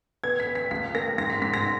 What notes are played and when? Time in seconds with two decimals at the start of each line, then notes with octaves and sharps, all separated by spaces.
0.24 B3 G#6
0.40 B6
0.47 B3
0.55 B6
0.71 C#2 B6
0.95 A#3 A#6
1.18 G#2 A#6
1.30 B6
1.42 G#2 B6
1.54 A#6